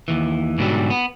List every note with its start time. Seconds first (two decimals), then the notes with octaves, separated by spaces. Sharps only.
0.08 D#2 E3
0.58 G#2 B2 D3 E3 F#3 G3
0.90 B3